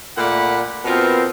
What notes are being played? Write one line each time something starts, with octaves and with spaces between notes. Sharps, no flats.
A#2 A3 A#3 D5 F#5 B5
B2 B3 C4 F4 A#4